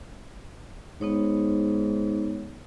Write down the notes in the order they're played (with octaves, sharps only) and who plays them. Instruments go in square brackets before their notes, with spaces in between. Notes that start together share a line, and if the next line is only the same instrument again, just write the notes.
[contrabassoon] G#2 [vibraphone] B3 D#4 C#5